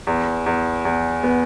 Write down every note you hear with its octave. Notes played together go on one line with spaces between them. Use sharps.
E2
E2
E2
B3